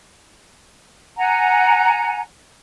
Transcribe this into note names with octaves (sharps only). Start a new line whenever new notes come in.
F#5 G#5 A#5